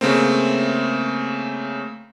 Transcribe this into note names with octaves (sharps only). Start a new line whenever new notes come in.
C#3 A3 A#3 C4